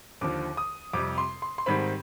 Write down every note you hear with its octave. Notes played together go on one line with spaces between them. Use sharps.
D#2 D3 F3 D6
D#6
F2 C3 G3 D6
C6
C6
C6
G#2 D#3 G3 C4 B5